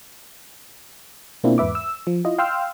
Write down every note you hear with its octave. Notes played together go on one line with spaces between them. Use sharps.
B2 A#3 C4 D4 E4 F4
E2 G#2 B4 E5 D6
E6
F3
E4 F4 D#5
F5 G5 C6 E6 F6